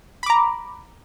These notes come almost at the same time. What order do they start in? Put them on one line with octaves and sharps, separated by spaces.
B5 D6 A#5